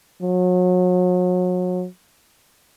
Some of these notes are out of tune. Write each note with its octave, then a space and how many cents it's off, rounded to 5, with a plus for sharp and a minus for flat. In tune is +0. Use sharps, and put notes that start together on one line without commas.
F#3 -35